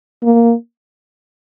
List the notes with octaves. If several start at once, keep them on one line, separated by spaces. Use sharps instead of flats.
A#3